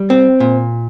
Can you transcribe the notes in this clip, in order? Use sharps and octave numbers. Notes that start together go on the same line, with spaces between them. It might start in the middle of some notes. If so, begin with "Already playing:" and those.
Already playing: G3
C4
A#2